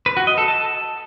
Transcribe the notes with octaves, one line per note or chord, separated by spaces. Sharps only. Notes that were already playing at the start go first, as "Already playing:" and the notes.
B4
F#4
D#5
A4
A5